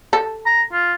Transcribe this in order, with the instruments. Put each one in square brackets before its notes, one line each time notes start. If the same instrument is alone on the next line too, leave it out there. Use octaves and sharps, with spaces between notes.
[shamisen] A4
[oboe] A#5
F4